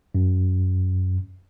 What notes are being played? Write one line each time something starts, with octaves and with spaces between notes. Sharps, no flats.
F#2